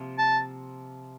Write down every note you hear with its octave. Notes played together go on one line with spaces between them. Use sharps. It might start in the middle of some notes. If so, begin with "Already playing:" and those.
Already playing: C3 F3 A#3 F4
A5